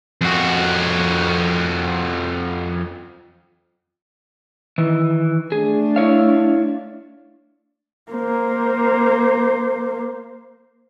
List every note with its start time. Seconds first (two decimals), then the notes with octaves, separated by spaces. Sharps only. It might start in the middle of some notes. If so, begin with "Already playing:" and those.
0.21 F2 F#4
4.78 D#3 E3
5.52 A3 D4 G#4
5.96 E4 C#5 F5
8.12 A#3 C5